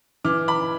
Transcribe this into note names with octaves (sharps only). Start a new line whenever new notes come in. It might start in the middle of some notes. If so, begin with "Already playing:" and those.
E3 D6 F6
B5 D6